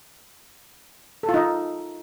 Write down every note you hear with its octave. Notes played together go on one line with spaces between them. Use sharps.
A4
F4
D#4